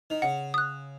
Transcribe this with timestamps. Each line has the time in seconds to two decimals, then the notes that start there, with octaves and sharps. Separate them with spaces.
0.10 D#3
0.22 C#3 F#5
0.54 D#6 F#6